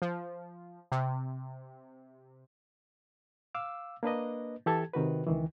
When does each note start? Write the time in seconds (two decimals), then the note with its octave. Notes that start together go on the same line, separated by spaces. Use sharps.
0.02 F3
0.92 C3
3.55 F5 D6 E6
4.03 A#3 D4 B4 D#5
4.66 E3 G4 A4 A5 G#6
4.94 C3 D#3 F#4 B4
5.26 C#2 D#3 E3